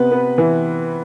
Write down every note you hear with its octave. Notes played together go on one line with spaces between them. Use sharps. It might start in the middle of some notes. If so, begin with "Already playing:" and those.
Already playing: C3 B3 B4
B3
E3